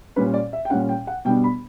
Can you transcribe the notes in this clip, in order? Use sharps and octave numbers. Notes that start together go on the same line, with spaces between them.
A#2 G3 C#4 B4
D5
E5
G5
A#2 G3 C#4 F#5
G5
F#5
B2 G3 B3 D4 G5
B5